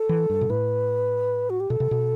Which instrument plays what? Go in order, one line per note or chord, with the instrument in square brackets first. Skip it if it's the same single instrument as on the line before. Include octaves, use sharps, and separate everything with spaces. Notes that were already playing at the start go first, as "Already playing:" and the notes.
Already playing: [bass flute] A4
[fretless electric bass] E3
G2
B2
[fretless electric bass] A2 [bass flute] B4
[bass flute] F#4
G4
[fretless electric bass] B2 [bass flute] A4
[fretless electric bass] C3
B2